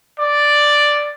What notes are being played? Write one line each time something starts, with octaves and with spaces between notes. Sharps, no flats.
D5